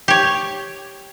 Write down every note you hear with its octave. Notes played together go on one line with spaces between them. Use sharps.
G4 C#5